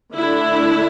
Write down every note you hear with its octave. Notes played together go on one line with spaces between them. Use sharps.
D3 A3 D4 E4